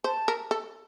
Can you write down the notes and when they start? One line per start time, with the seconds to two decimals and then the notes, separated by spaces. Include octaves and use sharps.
0.04 C5 A5
0.28 A#4
0.51 A4